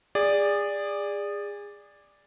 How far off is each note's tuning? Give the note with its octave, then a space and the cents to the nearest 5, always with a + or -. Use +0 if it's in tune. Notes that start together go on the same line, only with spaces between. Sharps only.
G#4 -25 D5 +0